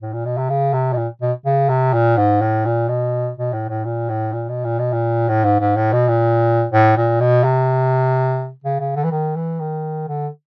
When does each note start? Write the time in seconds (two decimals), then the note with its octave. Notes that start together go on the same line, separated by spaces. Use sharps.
0.02 A2
0.13 A#2
0.26 B2
0.38 C3
0.50 C#3
0.73 C3
0.93 B2
0.97 A#2
1.22 B2
1.46 C#3
1.69 C3
1.94 A#2
2.17 G#2
2.41 A2
2.66 A#2
2.89 B2
3.37 B2
3.53 A2
3.69 A2
3.85 A#2
4.09 A2
4.33 A#2
4.49 B2
4.65 A#2
4.79 B2
4.93 A#2
5.29 A2
5.44 G#2
5.61 G#2
5.76 A2
5.93 B2
6.08 A#2
6.72 A2
6.97 A#2
7.21 B2
7.44 C3
8.64 C#3
8.80 C#3
8.96 D3
9.04 E3
9.12 D#3
9.36 E3
9.60 D#3
10.08 D3